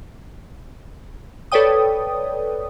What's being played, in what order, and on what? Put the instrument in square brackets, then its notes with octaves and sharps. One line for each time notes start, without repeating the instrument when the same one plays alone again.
[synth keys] A4 B4 C#5 D5 G5 D#6